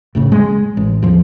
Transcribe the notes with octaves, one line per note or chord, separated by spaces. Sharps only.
F1 A2 C#3
G#3
A1
E2 F3